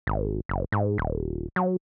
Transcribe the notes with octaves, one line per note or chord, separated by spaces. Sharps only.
G#1
F#1
G#2
D#1
F#3